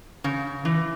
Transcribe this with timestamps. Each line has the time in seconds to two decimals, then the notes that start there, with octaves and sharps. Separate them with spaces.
0.24 C#3
0.65 E3